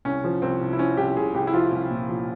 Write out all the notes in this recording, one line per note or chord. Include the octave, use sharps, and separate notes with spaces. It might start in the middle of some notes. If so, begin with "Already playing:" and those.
C2 C#4
F3
C2 C4
C2
E4
F3 C#4
C2 G4
C2 G#4
C2 G4
E4
F3 F4
C2
A#2
F3